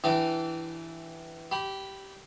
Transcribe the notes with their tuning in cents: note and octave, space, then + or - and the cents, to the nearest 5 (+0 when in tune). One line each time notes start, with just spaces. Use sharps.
E3 +0 D4 +0 G4 -30
G4 -15 B5 +0